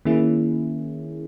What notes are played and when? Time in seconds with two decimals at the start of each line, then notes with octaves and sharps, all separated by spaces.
0.05 D#3 A#3 C#4 E4 G#4